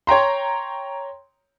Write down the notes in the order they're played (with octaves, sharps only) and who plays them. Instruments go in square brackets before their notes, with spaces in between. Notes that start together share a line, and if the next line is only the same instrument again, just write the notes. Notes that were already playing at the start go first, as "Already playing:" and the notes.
[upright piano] C#5 G5 A#5 C6